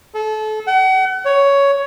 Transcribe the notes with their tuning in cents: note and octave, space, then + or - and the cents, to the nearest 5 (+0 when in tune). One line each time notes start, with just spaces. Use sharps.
A4 -30
F#5 +35
C#5 +10